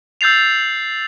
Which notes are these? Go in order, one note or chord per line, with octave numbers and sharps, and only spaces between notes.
E6 G6 A6 C7 F7